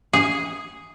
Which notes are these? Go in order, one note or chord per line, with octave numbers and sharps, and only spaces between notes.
G#4